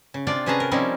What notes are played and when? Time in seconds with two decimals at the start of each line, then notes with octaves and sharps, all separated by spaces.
0.14 C#3
0.27 C3 D4 F4 D5 G5
0.46 C3 C#4 G#4 B4 A5 A#5
0.60 A#4
0.71 F3 G3 C4 C#4 D#4 E4